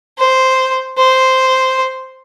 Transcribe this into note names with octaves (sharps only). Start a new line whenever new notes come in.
C5
C5